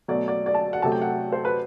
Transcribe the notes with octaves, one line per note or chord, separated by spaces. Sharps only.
B2 F#3 A3 D5
D5
D5
A5
F#5
C3 F#3 A3 A5
G5
F#5
C5
B4